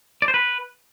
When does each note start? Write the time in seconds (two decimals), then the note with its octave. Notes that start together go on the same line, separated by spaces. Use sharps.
0.22 D5
0.28 C5
0.34 B4